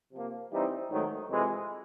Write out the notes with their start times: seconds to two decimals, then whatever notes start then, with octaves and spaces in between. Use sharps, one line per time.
0.12 C3 F3 A#3
0.50 E3 G3 C4 D#4
0.89 G#2 D#3 F#3 A3
1.28 F2 C3 E3 G#3